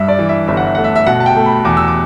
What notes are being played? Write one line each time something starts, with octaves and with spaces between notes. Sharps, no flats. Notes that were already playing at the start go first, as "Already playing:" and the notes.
Already playing: G2 E5
D5
E3
E5
G1 E5
F#5
E5
A3 F#5
E5
E5
B2 F#5
A5
G5
A3
B5
E2 D6
E6
D6